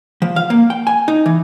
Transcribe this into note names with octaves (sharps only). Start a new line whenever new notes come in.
F3
F5
A#3
G5
G#5
D#4
E3